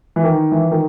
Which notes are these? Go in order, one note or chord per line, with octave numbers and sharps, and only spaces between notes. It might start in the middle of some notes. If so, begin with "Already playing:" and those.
E3
D#3
E3
D#3